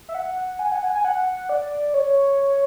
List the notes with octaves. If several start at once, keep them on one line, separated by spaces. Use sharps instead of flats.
E5
F#5
G#5
F#5
G#5
G#5
F#5
D5
C#5